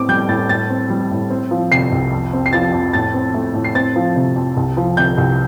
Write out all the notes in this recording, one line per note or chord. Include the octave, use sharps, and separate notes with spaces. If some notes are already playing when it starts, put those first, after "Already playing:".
Already playing: A2 C4 D6
G3 G6
A2 A6
A2 A6
C4
G3
A2
C4
F3
C3 C7
C2
F2
C4
C7
F3 A6
F2
A2 A6
C4
A3
A2
C7
C4 A6
F3
C3
F2
C2
F3
C3 G6
C2